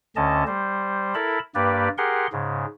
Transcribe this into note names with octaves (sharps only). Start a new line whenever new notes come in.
D2 D3 C#4 D#5 A5
G3 C5
E4 A4 A#4 A5 B5
G2 A#3 G4 B4 D5
G4 G#4 A#4 F#5 C6
G#2 C#3